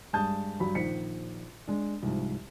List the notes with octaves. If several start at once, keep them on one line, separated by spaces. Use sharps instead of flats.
G2 G#3 A5 D#6 G6
G2 F#3 B5
A#1 D#3 C5 B6 C#7
G#3 D4
C2 G#2 F3